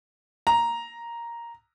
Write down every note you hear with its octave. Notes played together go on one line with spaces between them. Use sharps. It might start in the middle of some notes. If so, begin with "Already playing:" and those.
A#5